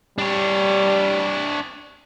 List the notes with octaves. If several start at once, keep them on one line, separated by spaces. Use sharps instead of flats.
G3 D4 C#5